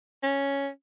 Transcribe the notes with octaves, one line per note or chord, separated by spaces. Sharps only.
C#4